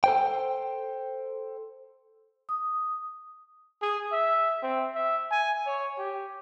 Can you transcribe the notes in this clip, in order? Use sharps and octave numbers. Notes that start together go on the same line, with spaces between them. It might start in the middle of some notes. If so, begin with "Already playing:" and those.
A4 C5 G5
D#6
G#4
E5
C4
E5
G#5
C#5
G4